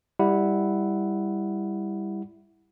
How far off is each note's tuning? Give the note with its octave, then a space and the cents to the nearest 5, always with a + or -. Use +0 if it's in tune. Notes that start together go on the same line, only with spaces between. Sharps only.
G3 +15 E4 +0 F#5 +0